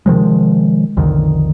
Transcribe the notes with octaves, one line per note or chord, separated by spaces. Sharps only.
C3 D#3 F3 G#3
B1 F2 D3 D#3